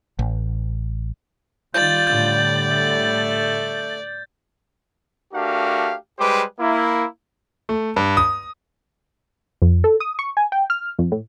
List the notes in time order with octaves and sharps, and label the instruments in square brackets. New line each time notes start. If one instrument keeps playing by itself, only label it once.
[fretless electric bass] A1
[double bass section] D#3 G3 [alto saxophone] F4 [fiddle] D5 [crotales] G6 A6
[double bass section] A2 D3 G3 [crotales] G6
[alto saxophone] A3
[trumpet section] A3 D4 F#4 G4 A#4 F5
G3 G#3 G4 B4 C5 D6
A#3 E4
[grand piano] A3
G2
D#6
[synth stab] F2
A4
D#6
C#6
G#5
G5
F6
F2
A2